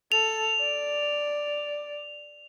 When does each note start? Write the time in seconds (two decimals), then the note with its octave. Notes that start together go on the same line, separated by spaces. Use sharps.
0.12 A4 F7
0.60 D5